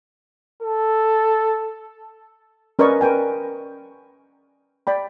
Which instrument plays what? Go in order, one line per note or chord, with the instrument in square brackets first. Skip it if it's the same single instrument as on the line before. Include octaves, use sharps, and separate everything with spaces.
[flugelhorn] A4
[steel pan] C#4 A#4 B4 D5 D#5 C#6
A#4 B4 G5 G#5
D5 G5 B5